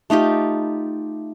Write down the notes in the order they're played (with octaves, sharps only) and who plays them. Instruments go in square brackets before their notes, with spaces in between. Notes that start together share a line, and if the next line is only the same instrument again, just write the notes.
[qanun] A3 D#4 F4 G4